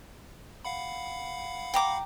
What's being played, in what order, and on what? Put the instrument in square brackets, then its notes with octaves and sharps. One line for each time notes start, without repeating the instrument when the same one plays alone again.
[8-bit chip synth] F5 F#5 B5
[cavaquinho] G5 A#5 D6